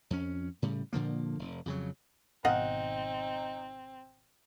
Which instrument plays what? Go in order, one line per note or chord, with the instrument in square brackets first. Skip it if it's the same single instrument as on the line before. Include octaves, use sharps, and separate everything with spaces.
[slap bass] F2 C#4
A2 C#3 G3
A#2 D3 F3 A#3
F1
F2 C#3 F#3
[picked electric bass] G#1 B2 [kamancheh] C4 [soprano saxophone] D#4 [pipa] D#5 F5 F#5